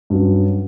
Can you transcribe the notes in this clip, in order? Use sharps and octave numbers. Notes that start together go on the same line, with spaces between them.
G2 F#3 C#4